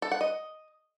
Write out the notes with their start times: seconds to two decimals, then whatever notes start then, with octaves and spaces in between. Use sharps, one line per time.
0.02 A4
0.12 F#5
0.21 D#5